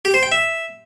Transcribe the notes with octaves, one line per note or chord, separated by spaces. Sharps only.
G4
C5
G5
E5